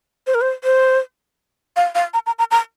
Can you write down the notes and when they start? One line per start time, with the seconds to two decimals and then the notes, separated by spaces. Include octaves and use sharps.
0.27 C5
0.35 A#4
0.41 C5
0.64 C5
1.76 F5
1.95 F5
2.14 A#5
2.27 A#5
2.39 A#5
2.51 A#5